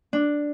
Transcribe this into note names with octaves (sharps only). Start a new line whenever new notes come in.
D4